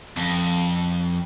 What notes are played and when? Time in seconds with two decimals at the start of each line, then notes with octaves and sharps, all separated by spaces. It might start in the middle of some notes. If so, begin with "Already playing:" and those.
0.17 F2